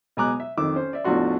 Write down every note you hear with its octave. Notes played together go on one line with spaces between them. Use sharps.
B2 G#3 G#5 A#5 D6 F#6
E5
F2 D#3 D6 E6
C#4 C5
D5 E5
A1 E2 F3 D4 F#4 C6